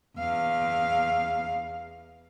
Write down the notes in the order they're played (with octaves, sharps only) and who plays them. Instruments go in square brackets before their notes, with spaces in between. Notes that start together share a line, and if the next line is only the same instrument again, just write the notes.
[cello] E2 F5